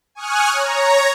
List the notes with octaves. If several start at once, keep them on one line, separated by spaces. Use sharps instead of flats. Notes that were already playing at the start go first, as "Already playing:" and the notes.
G#5 C#6 D#6 F6 F#6
C#5 A#5